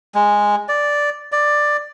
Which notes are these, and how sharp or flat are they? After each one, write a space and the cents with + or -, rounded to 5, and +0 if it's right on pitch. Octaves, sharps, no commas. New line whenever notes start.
G#3 -10
D5 -5
D5 +10